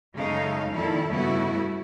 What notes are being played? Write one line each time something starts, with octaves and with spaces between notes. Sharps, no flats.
F#2 C#3 G#3 A3 D#4 F5
F2 A#2 D#3 E4 A4
G2 C#3 A3 B3 E4 F#4